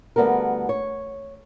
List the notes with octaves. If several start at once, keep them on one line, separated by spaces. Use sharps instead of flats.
D2 G3 B3 A4 A#4
C#5